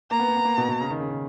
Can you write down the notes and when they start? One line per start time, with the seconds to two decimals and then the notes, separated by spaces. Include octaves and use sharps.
0.11 A#3 A#5
0.20 B3
0.28 A#3
0.36 B3
0.45 A#3
0.58 B2
0.68 B2
0.81 C#3
0.90 D#3
1.00 C#3
1.10 D#3